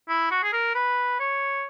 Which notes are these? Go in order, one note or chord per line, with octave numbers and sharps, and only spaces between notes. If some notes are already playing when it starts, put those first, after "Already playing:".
E4
F#4
G#4
A#4
B4
C#5